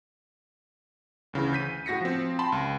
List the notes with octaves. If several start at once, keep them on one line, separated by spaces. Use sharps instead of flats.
D2 C#3 E3
G6 B6 D#7
A2 F#4 A#6 B6 C#7
F3 C4
G5 A5 B5 C6
C#2